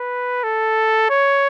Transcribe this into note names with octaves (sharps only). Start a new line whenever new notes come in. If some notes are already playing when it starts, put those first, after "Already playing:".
Already playing: B4
A4
C#5